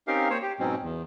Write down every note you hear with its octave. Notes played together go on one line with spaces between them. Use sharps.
C4 C#4 D#4 G4 A#4 F5
A#3 C5 C#5
G4
G#2 B2 F#3 C4 C#4
E2